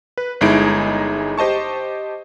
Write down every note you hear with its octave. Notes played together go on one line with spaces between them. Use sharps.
B4
G1 G#3 D#4 E4 D7
G4 C5 D#5 A5 C#6